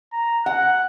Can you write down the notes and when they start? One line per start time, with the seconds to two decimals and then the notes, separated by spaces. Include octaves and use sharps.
0.13 A#5
0.46 F#5 F#6